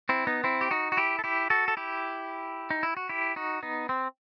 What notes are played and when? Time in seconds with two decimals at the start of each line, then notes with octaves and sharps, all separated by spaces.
0.09 C4 E4
0.27 B3 D#4
0.44 C4 E4
0.61 G4
0.71 D#4 F#4
0.92 F#4
0.97 E4 G4
1.19 A4
1.24 E4 G4
1.50 F#4 A4
1.68 A4
1.77 E4 G4
2.71 D#4
2.83 E4
2.97 F#4
3.09 E4 G4
3.36 D#4 F#4
3.63 B3 D#4
3.89 C4